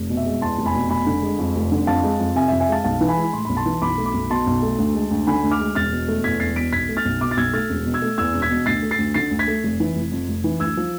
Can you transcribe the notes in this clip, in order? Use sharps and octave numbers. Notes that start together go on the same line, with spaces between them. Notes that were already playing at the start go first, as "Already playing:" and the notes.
Already playing: F1
B2
E5
G#3
E2 A5 C6
F1
G#5 B5
B2
F1 G#5 B5
D3
G#3
F2
F1
D3
F2 F5 A5
G#3
F2
C3 E5 G#5
F2 E5
E5 G#5
G#3 F5 A5
B1 F5 A5
E3
G#5 B5
G#3
A2 C6
B1 B5
A5 C6
E3
B1 B5 D6
A3
B5 D6
B1
B2 A5 C6
B1
A3
D2
G#3
D2
D3 G#5 B5
D2
D6 F6
G#3
E1 F6 A6
B2
A3
E2 G#6 B6
E1 A6 C7
B2 B6 D7
B1 G#6 B6
A3
F6 A6
B1
B2 D6 F6
A6
B1 E6 G#6
A3 F6 A6
E1
B2
E6 G#6
A3
E2 E6 G#6
E1
G#6 B6
B2
D2 A6 C7
A3
A6 C7
D2
D3 A6 C7
D2
G#6 B6
A3
F1
E3
F1
F2
F1
E3
D2 E6 G#6
F3